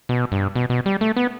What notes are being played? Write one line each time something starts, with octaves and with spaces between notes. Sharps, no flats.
B2
G2
B2
B2
G3
A3
B3